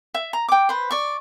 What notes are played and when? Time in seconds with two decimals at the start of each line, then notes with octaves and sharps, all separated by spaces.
0.14 E5
0.33 A#5
0.49 G5 D6
0.69 B4 C5
0.91 D5 C#6